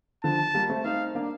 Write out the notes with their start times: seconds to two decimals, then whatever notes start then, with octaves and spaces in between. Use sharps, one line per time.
0.24 D3 F3 A5
0.55 G3 A#3
0.70 A3 C4
0.85 C4 D#4 F5
1.15 A#3 D4